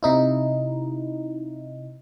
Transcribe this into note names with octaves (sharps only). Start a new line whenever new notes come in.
C3 D#4 E4